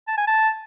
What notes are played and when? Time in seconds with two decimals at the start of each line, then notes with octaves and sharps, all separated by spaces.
0.08 A5
0.18 G#5
0.27 A5